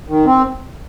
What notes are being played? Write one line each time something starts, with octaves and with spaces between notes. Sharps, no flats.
D#3
C4